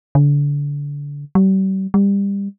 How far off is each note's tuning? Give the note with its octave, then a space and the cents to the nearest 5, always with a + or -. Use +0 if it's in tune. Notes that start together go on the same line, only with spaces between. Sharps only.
D3 -30
G3 -40
G3 +25